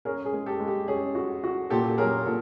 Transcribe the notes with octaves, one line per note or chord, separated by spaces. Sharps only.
C#4 G#4 A#4
G#4
G#3
G4 A4
G#3
G4
C#4 G#4
F#4
F#4
A#2 G4 A4
F#3 G#4 A#4
A#2 A4